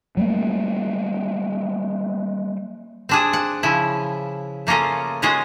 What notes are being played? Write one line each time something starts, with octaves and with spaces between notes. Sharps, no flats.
F#3 G3 A3 A#3
C4 D4 G#4
F#5
C#3 F3 E4
A3 A#3 C#4 F4 G#4
G#3 C#4 F4 F#4 G#4